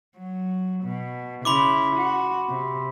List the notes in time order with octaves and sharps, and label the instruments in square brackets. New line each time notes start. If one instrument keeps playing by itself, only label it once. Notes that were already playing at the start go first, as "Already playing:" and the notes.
[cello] F#3
B2
[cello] C#3 E4 [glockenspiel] B5 C6 D6
[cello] F#4
C3